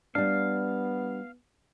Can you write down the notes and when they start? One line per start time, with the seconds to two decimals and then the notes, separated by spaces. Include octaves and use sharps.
0.15 G3 B3 D4 F5